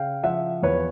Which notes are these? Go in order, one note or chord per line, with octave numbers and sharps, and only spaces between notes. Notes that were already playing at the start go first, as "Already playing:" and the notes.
Already playing: C#3 F5 G5
F3 E5 F#5
E2 B4 C#5